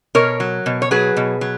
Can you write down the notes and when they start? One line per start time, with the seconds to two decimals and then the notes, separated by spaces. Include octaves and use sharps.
0.15 B2 A#4 C#5
0.40 F#3
0.66 B2
0.82 C#5
0.91 F#3 G#4 B4
1.17 B2
1.41 F#3